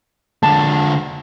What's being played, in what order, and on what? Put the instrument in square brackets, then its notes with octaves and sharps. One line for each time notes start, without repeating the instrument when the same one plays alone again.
[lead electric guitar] D3 G#3 [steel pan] A5